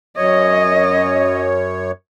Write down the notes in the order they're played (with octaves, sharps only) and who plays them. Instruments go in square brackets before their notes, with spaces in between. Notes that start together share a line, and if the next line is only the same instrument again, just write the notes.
[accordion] F#2 C#5 [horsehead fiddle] D#5